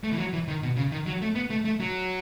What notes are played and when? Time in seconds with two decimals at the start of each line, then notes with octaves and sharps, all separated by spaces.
0.04 A3
0.12 E3
0.18 F#3
0.33 E3
0.48 D#3
0.62 B2
0.77 C#3
0.92 D#3
1.06 F#3
1.22 A3
1.35 B3
1.50 A3
1.65 A3
1.80 F#3